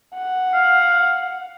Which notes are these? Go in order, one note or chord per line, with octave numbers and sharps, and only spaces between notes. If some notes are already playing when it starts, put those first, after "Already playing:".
F#5
F5